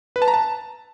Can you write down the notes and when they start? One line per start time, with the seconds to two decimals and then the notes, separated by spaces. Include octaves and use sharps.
0.16 B4
0.22 A5
0.28 A#5
0.34 A5